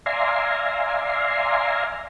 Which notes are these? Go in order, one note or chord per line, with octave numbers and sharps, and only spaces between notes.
D5 E5 F5 G#5 A#5 C6